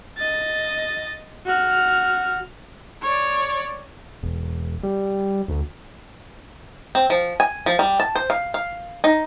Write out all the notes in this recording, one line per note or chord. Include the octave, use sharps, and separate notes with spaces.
D#5 A6
F#4 F6
C#5 D5
E1
G3
D2
C4
F3
G#5
F3
G3
A5
C5
F5
F5
D#4